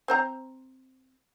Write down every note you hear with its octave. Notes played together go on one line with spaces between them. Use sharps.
C4 C5 A#5